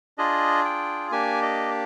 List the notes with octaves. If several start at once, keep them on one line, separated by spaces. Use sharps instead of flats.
D4 F4 G#4 D#5
G5
A#3 D4 G4 G#5
D#5